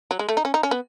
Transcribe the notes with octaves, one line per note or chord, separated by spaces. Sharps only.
F#3
G#3
A3
D#4
C#4
D#4
C#4
B3